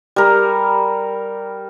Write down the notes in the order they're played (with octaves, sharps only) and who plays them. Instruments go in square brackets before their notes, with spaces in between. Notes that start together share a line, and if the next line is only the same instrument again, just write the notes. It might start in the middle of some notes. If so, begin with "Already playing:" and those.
[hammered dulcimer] G3 A#4